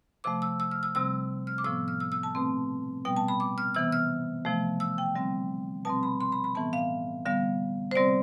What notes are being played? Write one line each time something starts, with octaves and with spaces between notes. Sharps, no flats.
C3 F3 A3 D6
E6
E6
F6
E6
C3 G3 C4 E6
F6
D6
A2 F3 B3 E6
F6
E6
E6
A5
B2 A3 C4
B2 G3 B3 G5
A5
B5
D6
F6
C3 E3 B3 E6
F6
C3 F3 A3
E6
G5
D3 G3 C4
B2 G3 C4 A5
B5
C6
B5
B5
A2 E3 B3 A5
F5
D3 G3 B3 F5
C5
C3 G3 C4 D5